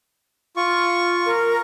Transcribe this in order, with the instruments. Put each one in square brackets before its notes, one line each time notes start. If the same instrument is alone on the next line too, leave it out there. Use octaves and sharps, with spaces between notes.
[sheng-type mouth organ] F4 C#6
[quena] A#4